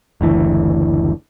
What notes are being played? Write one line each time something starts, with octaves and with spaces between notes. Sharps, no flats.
F#1 D2 E3